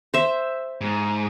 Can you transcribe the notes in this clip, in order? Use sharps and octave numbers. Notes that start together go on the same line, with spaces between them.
C5 E5
G#2